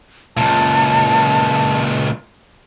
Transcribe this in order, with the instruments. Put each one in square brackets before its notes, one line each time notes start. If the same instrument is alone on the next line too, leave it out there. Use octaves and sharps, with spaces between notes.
[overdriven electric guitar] C#2 A#2 [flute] A5